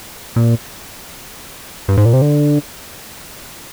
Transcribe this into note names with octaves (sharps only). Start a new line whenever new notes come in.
A#2
G2
G#2
A#2
C3
D3